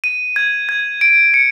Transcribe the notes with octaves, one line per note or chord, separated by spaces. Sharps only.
D#7
G#6
G#6
D7
C#7